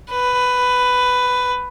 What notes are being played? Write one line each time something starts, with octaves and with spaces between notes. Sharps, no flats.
B4